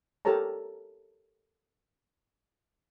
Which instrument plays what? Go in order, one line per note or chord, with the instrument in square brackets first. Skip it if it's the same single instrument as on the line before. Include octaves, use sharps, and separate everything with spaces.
[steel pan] G4 A4 A#4 C#5 A5 A#5